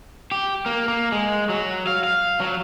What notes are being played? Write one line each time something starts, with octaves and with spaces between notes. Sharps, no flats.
G4
A#3
A#3
G#3
F#3
F5
F5
F#3